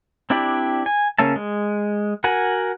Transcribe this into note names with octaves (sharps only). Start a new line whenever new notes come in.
C4 D4 E4 G4 D5
G#5
C#3 A#3 C#4 E5 A5
G#3
F#4 A#4 F#5 G#5